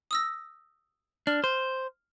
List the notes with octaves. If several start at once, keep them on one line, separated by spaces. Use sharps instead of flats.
D#6 E6 A#6
D4 F6
C5